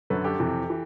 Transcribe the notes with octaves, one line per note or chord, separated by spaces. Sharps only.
F#2 D3 F#3 A4 B4
G4 A4
F2 C3 E3
E3